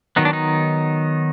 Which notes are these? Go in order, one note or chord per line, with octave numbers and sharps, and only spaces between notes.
D#3 F#3 B3 D#4
D4
D#4